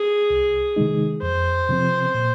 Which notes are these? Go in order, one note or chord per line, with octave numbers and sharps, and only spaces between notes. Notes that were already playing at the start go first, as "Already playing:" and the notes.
Already playing: G#4
C2
C3 D#3 G#3 D#4
F2 C5
C3 F3 C4
A#2